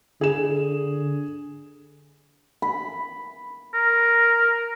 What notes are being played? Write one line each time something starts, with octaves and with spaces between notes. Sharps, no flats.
D3 G#4 E7
B5
A#4